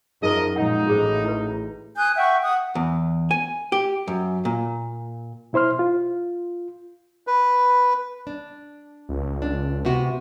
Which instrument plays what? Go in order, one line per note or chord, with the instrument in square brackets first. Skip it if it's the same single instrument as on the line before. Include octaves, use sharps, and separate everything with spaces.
[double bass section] F#2 [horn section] F3 A#4 D#5 [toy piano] D#4 G#4
[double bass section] A#2 F3 G#3 [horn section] D#4 [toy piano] F#5
[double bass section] A1 A2 [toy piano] F#4 G#4 C5
[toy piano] E4 B4
[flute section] G#5 D#6 F#6 G6
E5 F#5 G5 C#6
F#5 D#6
[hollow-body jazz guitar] E2
G#5
G4
F#2
A#2
[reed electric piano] B2 E4 C5 C6 F6
F4
[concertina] B4
[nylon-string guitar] D4
[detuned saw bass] C#2
[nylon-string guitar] D4
C3 B3 F#4